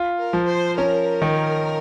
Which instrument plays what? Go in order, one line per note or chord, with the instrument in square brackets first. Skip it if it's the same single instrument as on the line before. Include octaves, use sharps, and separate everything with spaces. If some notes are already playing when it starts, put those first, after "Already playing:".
Already playing: [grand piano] F4
[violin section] A#4
[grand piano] F3
[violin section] C5
[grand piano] C#4 [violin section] A#4
[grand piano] D#3